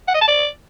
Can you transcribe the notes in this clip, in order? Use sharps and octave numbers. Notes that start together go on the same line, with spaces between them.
F#5
D#5
A5
D5